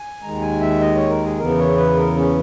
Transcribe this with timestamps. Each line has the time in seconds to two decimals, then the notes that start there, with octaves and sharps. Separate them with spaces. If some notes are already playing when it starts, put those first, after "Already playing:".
Already playing: G#5
0.22 D#2 D#3 G#3 A#5
0.41 G#5
0.61 E5
0.81 D#5
0.96 C#5
1.09 A#4
1.24 G#4
1.38 E2 C#3 E3 B3 A#4
1.59 C#5
1.77 B4
1.96 A#4
2.16 C#4